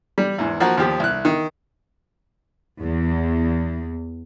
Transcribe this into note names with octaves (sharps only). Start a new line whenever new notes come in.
G3
E2 G#2
F3 A#3 F#4
D#2 F3 G4
C2 F#6
D#3
E2